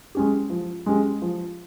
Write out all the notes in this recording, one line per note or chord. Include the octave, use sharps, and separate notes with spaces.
G#3 C#4 G4
F3
G#3 C#4 G4
F3